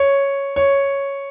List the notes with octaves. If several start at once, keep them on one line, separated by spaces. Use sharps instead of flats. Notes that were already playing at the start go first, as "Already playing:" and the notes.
Already playing: C#5
C#5